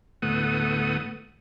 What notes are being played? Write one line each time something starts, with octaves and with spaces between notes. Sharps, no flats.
D2 A2 A3 B3 F#5 D#6